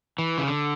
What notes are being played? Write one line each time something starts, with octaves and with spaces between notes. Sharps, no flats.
E3
C#3
D3